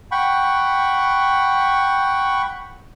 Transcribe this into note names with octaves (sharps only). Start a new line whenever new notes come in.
F#5 G5 B5 C#6